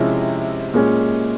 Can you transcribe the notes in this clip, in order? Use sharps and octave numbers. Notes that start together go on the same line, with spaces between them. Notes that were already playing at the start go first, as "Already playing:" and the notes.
Already playing: C3 F3 G#3 C#4 E4
A#2 G#3 C#4